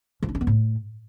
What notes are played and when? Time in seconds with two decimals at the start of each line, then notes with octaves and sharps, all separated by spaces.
0.22 F3
0.29 D4
0.35 C#4
0.41 B3
0.47 A2